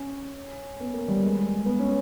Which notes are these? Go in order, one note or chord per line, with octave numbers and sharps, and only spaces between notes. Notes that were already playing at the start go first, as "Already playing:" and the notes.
Already playing: C#4
B3
A#3
G3
G#3
B3
C#4